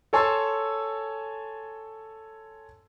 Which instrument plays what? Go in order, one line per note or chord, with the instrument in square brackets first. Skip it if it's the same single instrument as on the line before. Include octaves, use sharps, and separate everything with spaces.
[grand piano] A4 C#5 G#5 A5 C6 E6